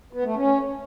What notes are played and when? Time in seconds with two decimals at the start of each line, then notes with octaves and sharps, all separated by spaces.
0.13 B3
0.24 A3
0.35 C#4